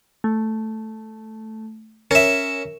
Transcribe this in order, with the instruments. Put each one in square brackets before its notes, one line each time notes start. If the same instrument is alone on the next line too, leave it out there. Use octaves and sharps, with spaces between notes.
[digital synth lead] A3
[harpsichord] C#4 E5 [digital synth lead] A#4